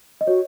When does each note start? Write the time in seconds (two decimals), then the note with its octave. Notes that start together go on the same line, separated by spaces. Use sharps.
0.21 D#5
0.27 F#4 C#5